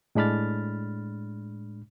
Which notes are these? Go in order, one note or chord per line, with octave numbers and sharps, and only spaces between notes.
A2 G#3 D4 B5 F6 A6